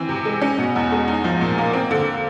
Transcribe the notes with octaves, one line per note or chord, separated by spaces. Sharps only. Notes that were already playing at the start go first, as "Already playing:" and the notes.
Already playing: E3 C4
C3
G#3
C#4
B2
E2
G#3
D#4
F3
A#2
A#3
C4
D3